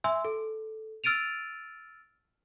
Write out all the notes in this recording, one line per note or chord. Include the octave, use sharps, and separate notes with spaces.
E5 G#5 C6 E6
A4
E6 F6 A6 D7 D#7 F7